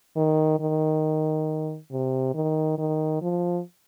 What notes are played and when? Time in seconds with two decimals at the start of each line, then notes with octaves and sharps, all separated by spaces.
0.16 D#3
0.60 D#3
1.91 C3
2.34 D#3
2.78 D#3
3.22 F3